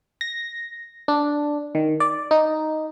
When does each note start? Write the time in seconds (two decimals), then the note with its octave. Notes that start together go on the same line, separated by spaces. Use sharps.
0.21 A#6
1.08 D4
1.75 D#3
2.00 D5
2.31 D#4